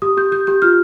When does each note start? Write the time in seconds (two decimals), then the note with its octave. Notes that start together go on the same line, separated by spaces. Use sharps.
0.02 G4 D#6
0.17 G4 G6
0.32 G4 G6
0.47 G4 G6
0.62 F4 F6